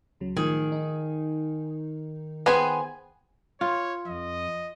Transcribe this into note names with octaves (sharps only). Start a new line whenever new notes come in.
C#2 C#3 F#3
A2 D#3 F3 G#4
D#4
B3 G#4 B4 C5 G5 G#5
F4 C#5
F2 D#5